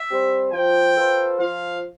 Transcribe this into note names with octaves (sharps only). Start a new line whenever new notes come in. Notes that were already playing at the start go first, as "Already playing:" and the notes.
Already playing: E5
G3 C4 G4 C5
F3 G5
B3 F4 A4 C5
F3 F5